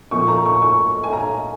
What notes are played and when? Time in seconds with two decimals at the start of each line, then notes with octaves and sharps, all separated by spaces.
0.11 A#2 F3 A#3 C#6
0.28 A#5
0.45 C#6
0.62 C#6
1.04 G#5
1.13 A#5